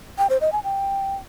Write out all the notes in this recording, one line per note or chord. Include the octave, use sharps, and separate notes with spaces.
G5
C5
D#5
G#5
G5